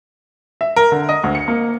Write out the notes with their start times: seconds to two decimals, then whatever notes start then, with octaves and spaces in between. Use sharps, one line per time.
0.61 E5
0.76 A#4
0.92 D3
1.09 D#5
1.24 D2
1.35 C#7
1.48 A#3